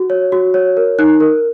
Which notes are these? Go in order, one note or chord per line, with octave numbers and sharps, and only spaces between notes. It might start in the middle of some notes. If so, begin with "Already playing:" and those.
Already playing: F#4
C#5
F#4
C#5
A#4
D#4 F#6
A#4